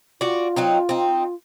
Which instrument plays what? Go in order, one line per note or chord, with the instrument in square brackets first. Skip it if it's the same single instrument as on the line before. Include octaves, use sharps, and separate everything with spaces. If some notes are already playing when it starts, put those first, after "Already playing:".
[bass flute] F4 [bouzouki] F#4 D5
[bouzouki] F#3 C4 D#4
C4 D#4